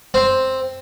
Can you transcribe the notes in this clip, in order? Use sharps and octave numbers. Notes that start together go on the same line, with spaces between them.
C4